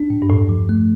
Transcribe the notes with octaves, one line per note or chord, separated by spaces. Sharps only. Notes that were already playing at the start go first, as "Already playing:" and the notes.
Already playing: D4
A2
G2
E2 A2
F3
A3